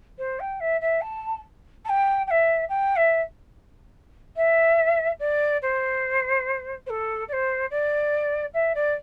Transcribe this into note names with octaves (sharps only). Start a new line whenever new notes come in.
C5
G5
E5
E5
A5
A5
G5
G5
E5
G5
E5
E5
D5
C5
C5
A4
D5
C5
D5
E5
D5